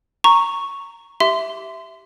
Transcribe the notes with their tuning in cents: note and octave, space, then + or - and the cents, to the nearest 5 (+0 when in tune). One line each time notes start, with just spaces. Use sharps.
A#5 -10 C#6 +0
G4 -20 E5 +0 C6 -20